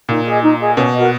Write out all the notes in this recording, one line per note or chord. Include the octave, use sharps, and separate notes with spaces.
A#2 D#4
G#4 D#5 G#5
D#4
G#4 D#5 G#5
B2 C#4
F#4 A#4 D#5